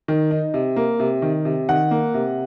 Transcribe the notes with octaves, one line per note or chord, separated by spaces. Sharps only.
D#3
D#4
C3
A#3
C3
D#3
C3
D#3 F#5
A#3
C3